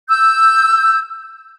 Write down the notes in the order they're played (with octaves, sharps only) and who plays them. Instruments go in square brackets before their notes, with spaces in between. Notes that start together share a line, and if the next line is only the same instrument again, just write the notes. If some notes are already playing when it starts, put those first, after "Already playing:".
[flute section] E6 G6